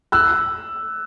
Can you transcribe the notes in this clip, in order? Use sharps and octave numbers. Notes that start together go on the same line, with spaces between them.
E6 F#6